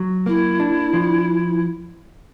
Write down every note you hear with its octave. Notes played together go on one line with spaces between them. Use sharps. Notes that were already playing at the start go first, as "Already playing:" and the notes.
Already playing: F#3
A#3 E4
D4
F3